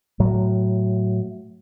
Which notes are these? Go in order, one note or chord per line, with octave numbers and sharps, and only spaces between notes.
A2 F#3